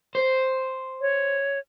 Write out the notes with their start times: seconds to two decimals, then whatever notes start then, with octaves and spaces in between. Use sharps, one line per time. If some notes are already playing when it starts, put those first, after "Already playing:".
0.15 C5
1.01 C#5